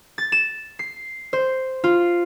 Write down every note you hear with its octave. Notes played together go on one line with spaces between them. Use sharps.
A6
E7
C7
C5
F4